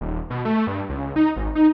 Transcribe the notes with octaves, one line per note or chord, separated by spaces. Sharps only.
D#1
B2
A3
G2
C#2
D#4
G#1
D#4